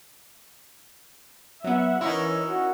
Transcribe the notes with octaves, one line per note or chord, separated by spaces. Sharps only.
F#3 B3 E5 F#5
E3 C#4 D#4 E4 A#4 C#5
F#4